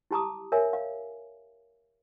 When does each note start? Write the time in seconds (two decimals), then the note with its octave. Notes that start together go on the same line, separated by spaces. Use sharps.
0.11 E4 G4 A5 A#5 D6 D#6
0.52 A#4 C#5 E5 G#5
0.73 F5